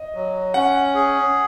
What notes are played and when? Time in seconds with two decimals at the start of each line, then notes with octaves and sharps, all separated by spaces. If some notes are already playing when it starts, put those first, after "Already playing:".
Already playing: D#5
0.14 F#3
0.54 C#4 F#5
0.95 G#4